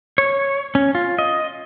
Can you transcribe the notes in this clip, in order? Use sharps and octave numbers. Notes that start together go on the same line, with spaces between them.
C#5
C#4
F4
D#5